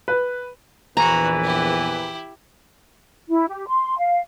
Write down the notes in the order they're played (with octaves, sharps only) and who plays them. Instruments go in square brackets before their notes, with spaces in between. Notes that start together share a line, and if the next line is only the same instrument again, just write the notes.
[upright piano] B4
[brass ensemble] A#1 E2 B4 [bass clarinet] E3 [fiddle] F#4 [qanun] A#5
[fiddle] E4 G4
[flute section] E4
G4
C6
F5